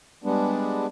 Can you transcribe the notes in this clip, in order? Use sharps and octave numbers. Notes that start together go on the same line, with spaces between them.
G3 G#3 B3 D4